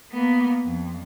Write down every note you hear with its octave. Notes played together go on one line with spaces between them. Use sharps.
A#3 B3
F2